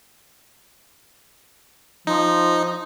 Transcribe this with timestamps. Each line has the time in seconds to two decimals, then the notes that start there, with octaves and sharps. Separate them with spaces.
2.07 F3 D#4